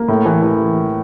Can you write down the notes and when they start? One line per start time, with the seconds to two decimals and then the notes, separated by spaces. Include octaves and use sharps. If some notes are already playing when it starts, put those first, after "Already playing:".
Already playing: A#3
0.08 A2
0.25 E3
0.43 E3